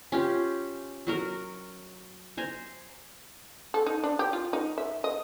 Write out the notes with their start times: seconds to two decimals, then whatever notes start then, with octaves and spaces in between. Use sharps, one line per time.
0.12 C#4 F4 G4
1.07 F#3 F#4 A#4
2.37 C5 G#5 A#5
3.74 A4
3.86 D#4
4.03 D4
4.19 G4
4.33 F4
4.53 D#4
4.78 E5
5.04 D#5